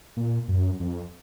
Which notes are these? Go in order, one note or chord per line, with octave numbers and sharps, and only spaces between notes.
A#2
F#2
F2